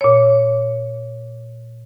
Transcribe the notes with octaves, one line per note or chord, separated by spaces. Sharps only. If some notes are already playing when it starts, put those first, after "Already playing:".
A#2 C#5